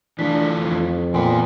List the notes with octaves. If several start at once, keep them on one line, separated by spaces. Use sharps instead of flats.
E3 A3 D4 F4 B6
F2
E2 A#2 B3 B4 G5 G#5 C6